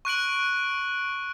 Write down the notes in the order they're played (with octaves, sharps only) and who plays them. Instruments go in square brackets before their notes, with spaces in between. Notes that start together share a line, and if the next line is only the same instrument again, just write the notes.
[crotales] C#6 F#6 D7 F#7